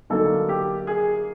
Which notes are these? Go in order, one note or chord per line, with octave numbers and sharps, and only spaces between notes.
D3 F#3 A#3 D#4 A4
G4
G#4